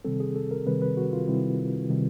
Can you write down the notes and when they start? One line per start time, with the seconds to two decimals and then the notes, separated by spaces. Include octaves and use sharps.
0.04 C3 D#3 G3 C4 A4
0.20 G#4
0.36 A4
0.51 A#4
0.66 C3 D#3 G3 C4 B4
0.82 B4
0.97 F#4
1.13 F4
1.28 C3 D#3 G3 C4 E4
1.89 C3 D#3 G3 C4